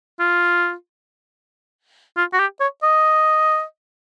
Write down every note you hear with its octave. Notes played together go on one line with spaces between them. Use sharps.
F4
F4
F#4
G4
C#5
D#5